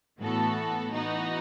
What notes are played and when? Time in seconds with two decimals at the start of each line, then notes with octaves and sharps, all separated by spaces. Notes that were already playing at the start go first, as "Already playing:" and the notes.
0.21 A2 E3 B3 F#4 A4
0.92 E3 B3 D#4 F#4